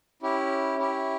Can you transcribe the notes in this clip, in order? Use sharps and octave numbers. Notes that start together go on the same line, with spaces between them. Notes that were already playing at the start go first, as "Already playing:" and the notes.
C#4 E4 G4
C#4 E4 G4